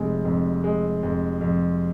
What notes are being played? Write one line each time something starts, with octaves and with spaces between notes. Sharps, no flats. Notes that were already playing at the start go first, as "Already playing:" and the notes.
Already playing: F1 C3 G#3
F2
G#3
F2
F2